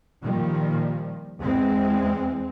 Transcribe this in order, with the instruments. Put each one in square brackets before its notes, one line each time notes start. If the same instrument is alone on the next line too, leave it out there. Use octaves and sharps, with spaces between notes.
[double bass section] A#2 D#3 F3 G3
E2 G#3 C4